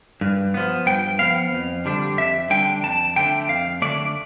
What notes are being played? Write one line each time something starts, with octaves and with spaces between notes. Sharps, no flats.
G2
F3 B3
G2 G5
F3 B3 F5
F2
D3 G3 D4
F2 E5
D3 G3 D4 G5
F2 A5
D3 A3 D4 G5
F2 F5
D3 A3 D4 D5